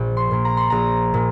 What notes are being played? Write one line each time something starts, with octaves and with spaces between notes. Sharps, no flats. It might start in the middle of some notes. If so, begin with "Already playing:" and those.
Already playing: A#1 A#2 A#3
C6
A#2 A#3
A#5
C6
A#1 A#5
A#2